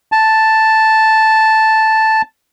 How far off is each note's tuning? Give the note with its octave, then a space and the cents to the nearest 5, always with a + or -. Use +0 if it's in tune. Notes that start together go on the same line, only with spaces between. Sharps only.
A5 +0